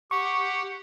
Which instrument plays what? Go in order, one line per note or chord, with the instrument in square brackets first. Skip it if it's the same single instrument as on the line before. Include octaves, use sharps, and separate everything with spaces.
[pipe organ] G4 F#5 [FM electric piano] C#6